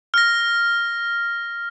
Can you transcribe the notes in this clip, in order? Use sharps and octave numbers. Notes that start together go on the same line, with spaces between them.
F6 A#6